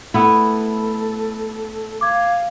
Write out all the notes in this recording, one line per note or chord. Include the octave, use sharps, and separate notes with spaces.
A3 B3 E4 A4
F5 D6 G#6